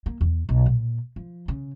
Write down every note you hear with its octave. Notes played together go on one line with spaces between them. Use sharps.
A#3
E2
B1
A#2
F3
C#3